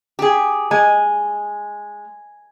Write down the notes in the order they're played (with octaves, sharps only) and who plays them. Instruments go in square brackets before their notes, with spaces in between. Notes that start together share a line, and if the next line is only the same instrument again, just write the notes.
[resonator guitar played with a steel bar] G4 G#4
[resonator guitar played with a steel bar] G#3 [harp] G#5